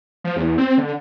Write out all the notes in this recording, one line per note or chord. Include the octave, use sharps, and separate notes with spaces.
F3
E2
C4
D3